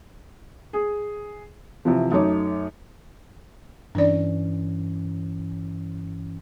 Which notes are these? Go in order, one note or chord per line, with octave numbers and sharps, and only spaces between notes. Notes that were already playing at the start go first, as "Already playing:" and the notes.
G#4
C3 E3 F3
F#2 A3 D#4 C#5 D6
G2 E3 C#4 D4 D5